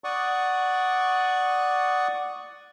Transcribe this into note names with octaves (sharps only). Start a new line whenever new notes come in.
D5 F#5 C#6 D#6